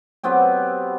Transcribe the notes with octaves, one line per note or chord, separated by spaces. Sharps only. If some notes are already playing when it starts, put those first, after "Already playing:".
F#3 B3 C4 G4